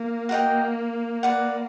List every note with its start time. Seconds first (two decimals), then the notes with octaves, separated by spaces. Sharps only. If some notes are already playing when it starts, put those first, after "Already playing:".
Already playing: A#3
0.29 F#4 A#4 D#5 G5
1.23 B4 D5 F#5